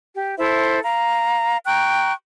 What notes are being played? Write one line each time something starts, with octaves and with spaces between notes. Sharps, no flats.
G4
E4 A4 C5 E5
F5 A#5
G5 A#5 C#6 F#6